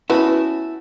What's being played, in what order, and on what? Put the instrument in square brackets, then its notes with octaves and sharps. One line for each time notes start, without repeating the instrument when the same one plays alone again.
[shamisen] B3 [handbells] C#4 A5 [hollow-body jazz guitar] E4 F#4